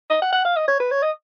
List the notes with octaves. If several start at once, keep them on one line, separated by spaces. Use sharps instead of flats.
D#5
F#5
F#5
F5
D#5
C#5
B4
C#5
D#5